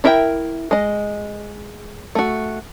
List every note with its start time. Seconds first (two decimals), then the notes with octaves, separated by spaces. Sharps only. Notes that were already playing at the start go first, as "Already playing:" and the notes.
0.04 D4 E4 A#4 E5 G5
0.71 G#3 D#5
2.15 A3 F#4